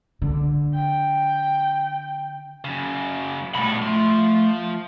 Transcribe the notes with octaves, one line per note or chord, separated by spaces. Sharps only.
D3
G5
F#2 C#3
G2 B2 A3 B5
F3 C6